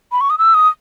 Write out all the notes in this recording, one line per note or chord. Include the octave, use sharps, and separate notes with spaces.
B5
C#6
D#6
E6
D#6